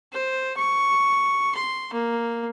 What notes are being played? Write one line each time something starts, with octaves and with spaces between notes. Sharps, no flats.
C5
C#6
C6
A#3